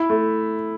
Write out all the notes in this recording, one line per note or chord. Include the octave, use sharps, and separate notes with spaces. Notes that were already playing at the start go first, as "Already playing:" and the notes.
Already playing: E4
A3